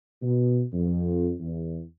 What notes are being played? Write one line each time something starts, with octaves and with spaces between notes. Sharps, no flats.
B2
F2
E2